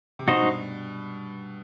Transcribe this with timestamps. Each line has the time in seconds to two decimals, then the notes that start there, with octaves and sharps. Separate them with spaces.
0.19 C3
0.28 B2 D#4 F#4 C5 D#5
0.42 G2